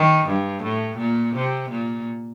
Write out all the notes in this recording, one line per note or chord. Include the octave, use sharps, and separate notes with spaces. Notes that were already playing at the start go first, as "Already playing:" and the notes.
Already playing: D#3
G2
A2
A#2
C3
A#2